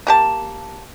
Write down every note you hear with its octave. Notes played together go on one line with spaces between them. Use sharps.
A#3 G4 A5